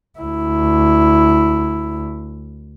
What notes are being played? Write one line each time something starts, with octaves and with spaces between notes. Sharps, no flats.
D2 E4